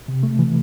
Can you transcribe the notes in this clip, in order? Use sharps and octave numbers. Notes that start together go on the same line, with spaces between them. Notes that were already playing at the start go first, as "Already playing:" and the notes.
C3
A3
E3